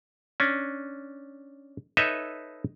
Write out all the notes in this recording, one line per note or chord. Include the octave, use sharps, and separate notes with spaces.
C#4 D4
D#4 A4 B4 C#5 D#5 E5